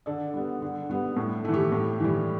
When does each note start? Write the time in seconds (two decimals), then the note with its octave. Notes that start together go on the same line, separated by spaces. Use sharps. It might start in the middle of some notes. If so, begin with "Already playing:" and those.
0.06 D3 A4 D5
0.34 G3 B3
0.62 D3
0.90 G3 B3
1.16 A2
1.45 E3 A3
1.54 G4
1.72 A2
2.00 E3 G3